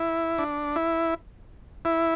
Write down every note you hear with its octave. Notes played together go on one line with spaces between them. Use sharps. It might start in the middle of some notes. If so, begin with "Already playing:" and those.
Already playing: E4
D4
E4
E4